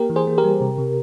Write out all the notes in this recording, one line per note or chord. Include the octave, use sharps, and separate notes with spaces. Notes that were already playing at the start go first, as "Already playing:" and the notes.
Already playing: A#3 G4 A#4
E3
G#4 C5
A#3
G4 A#4
G3
C3
C3